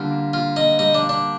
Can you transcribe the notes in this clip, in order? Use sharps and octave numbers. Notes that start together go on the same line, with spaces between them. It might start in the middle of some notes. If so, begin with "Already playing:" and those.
Already playing: D3 G3 A#3 F4
A#3
A#3 F4
A#3 D#4
G3 D#4
D4
A#3
D4